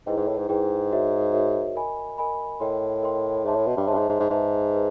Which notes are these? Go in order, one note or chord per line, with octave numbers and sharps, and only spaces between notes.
G#2 E4 G#4 B4 D#5 G5
G#2
A2
G#2
G#2 E4 G#4 B4 D#5 G5
F#4 A#4 C#5 E5
F#4 A#4 C#5 E5
A#4 D#5 G#5 B5
A#4 D#5 G#5 B5
A2 A#4 D#5 G5 C6
A#4 D#5 G5 C6
G#2 C#5 E5 A5 C6
A2
B2
G2
G#2 C#5 E5 A5 C6
G2
G#2
G#2
G#2
G#2 G#4 B4 E5 A5
G#4 B4